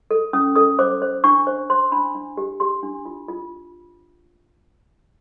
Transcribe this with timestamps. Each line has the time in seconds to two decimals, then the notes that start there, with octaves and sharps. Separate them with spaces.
0.11 A4
0.33 C#4 D#6
0.56 A4 D#6
0.79 C5 D6
1.02 C5
1.24 D4 C#6
1.47 C5
1.70 C5 C6
1.92 D4 B5
2.15 D4
2.37 G4
2.60 G4 C6
2.83 D4
3.05 F4
3.28 F4